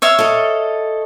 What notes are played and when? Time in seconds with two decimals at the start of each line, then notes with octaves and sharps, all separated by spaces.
0.02 C#5 E5 F5
0.19 A4 D#5